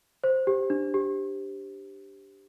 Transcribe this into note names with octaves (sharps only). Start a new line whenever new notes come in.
C5
G4
D4
G4